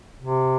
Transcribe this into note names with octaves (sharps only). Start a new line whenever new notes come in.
C3